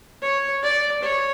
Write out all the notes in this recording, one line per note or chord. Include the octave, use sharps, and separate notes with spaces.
C#5
D5
C#5